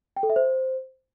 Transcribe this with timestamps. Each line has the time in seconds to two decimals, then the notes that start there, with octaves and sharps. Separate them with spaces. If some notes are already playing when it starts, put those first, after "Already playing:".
0.17 G5
0.23 A4
0.30 E5
0.36 C5